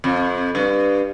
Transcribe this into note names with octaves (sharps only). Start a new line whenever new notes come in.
F2
G2